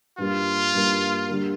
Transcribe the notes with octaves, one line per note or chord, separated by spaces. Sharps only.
G2 G3 A#3 F4
G2 G3 A#3
D3 G3 A#3